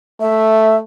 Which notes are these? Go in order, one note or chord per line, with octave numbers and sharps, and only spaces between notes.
A3 E5